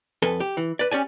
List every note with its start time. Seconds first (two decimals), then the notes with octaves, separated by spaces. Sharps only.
0.22 F2 A4 B4 G#5
0.40 G4
0.57 E3
0.79 B4 D5
0.91 C#4 G4 D5 G#5